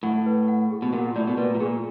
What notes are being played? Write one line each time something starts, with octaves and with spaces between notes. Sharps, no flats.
A2 F#5
B4
F#5
G#4
B2
A#2 F#5
A2 D5
B2
A#2 B4
A2
A#2 G#4